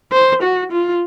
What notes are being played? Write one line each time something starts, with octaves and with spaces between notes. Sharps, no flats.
C5
F#4
F4